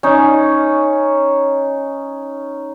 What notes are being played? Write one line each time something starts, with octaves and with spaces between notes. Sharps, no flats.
C#4 D#4